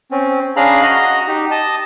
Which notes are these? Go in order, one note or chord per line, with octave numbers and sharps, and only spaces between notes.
C4 C#4
C#4 D4 G#4 F5 A#5 B5
F#4 D#5 A#5
D#4 G4
D#5 A5